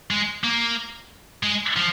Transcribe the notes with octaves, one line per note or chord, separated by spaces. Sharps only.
G#3
A#3
G#3
F3